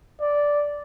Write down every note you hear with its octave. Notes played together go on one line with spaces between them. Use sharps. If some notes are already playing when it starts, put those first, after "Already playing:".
D5